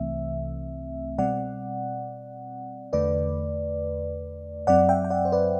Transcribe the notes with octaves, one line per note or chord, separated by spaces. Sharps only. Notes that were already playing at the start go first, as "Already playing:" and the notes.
Already playing: C2 C3 E3 A3 C4 E5
B2 G3 C4 D5 F#5
E2 D3 A3 B4 D5
F#2 F#3 C4 D5 F#5
E5 G5
G5
D5 F#5
C5
B4 D5